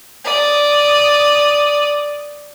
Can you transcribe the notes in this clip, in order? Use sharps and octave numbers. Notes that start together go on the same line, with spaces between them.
D5 D#6